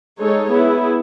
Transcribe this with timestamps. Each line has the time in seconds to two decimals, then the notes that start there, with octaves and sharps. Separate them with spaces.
0.19 G#3 D#4 A4 C#5
0.51 B3 E4 G#4